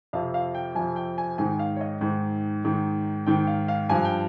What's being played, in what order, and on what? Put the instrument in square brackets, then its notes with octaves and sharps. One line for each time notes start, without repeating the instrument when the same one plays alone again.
[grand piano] F2 C3 F3 F5
F5
G5
F2 C3 F3 G#5
G5
G#5
G#2 D#3 G#5
F5
C#5
D#5
G#2 D#3
G#2 D#3
G#2 D#3 G5
F5
F5
G2 F3 G#5
G5